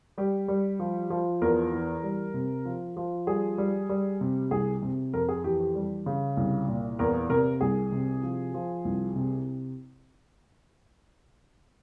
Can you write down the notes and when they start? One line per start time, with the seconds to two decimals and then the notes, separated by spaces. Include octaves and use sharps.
0.18 G3 G4
0.48 G3
0.80 F3
1.10 F3
1.42 E2 A#4
1.72 E3
2.03 G3
2.34 C3
2.65 F3
2.97 F3
3.27 G3 G#4
3.58 G3
3.89 G3
4.21 C3
4.51 C2 G#4
4.82 C3
5.13 F2 A#4
5.29 G#4
5.44 E3 G4
5.60 G4
5.75 G3
6.06 C#3
6.37 C2
6.68 A#2
6.99 E2 A#4
7.29 C3 A#4
7.61 C2 G#4
7.92 C3
8.23 F3
8.54 F3
8.85 C2
9.16 C3